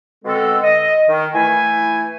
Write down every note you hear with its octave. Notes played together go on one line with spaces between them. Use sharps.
B2 D3 G#3 C4 A4
D#5
D#3
E3 A3 E4 G#5